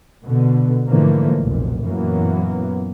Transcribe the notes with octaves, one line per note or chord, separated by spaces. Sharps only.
B2 D3 B3
G#2 D3 E3 F3 A3 A#3
F1 B1 A#2
F#2 A#2 E3 F#3 A#3 B3